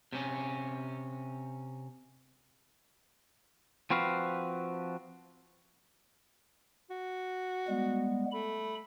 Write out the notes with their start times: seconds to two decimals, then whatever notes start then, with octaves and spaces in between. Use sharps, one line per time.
0.12 C3 C#4
3.90 F3 C4 F#4 B4 F5
6.90 F#4
7.68 G3 G#3 B3
8.32 A3 B5